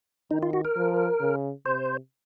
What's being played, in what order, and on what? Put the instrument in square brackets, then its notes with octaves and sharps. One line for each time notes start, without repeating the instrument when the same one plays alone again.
[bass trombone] D#3 [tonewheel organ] D#4
[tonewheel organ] F4
F#4
A#4
[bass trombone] F3
C#3
[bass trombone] C3 [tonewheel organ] C5